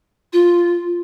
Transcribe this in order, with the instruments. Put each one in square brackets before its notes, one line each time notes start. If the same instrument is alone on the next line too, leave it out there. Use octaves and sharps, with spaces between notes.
[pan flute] F4